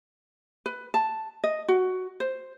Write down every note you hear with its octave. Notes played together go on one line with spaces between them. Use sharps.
B4
A5
D#5
F#4
C5